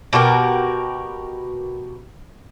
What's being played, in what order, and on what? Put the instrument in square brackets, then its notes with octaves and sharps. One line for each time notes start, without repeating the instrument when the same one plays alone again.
[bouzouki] B2 F#4 G4 A#4